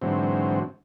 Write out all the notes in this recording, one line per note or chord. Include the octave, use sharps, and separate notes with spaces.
G#2 D3 E3 F#3 C4